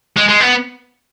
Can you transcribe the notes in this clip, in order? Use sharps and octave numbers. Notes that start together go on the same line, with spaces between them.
G#3
G#3
B3